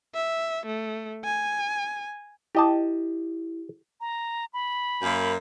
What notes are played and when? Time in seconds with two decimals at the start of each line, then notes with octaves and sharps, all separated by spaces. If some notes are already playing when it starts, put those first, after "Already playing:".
0.15 E5
0.66 A3
1.25 G#5
2.55 E4 G4 D#5 A5
4.01 A#5
4.53 B5
5.02 F#2 A#3